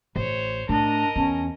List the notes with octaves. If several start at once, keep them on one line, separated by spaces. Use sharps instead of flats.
A1 C5 C#5
A2 D4 A#4 D#5 A5
E2 C#4